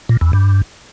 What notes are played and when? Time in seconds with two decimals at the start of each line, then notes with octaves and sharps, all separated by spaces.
0.09 A#2
0.21 E2
0.33 G2